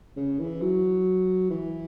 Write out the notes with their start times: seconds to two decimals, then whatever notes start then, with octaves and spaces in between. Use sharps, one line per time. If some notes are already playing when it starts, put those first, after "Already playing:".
0.16 C#3
0.39 E3
0.61 F#3
1.50 E3